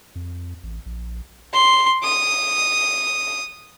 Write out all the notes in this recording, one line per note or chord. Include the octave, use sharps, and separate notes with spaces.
F2
A1
A#1
C6
D#6